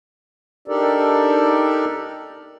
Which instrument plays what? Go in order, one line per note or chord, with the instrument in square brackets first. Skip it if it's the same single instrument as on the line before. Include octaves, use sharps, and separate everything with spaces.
[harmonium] D4 D#4 G4 A4 A#4 D5